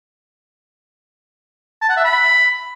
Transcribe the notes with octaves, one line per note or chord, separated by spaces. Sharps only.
A5
F#5
E5
B5